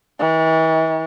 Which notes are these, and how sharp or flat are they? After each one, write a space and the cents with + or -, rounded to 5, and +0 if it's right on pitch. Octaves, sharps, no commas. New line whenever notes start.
E3 -40